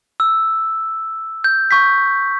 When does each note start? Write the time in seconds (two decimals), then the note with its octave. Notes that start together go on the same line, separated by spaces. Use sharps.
0.20 E6
1.44 G6
1.71 C#6 G6 B6